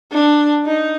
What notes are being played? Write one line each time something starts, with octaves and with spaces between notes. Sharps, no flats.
D4
D#4